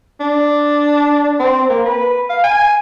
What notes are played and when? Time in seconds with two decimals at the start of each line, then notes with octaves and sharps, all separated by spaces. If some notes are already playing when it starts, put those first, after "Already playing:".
0.20 D4
1.40 C4
1.69 A#3
1.86 B4
2.30 F5
2.44 G#5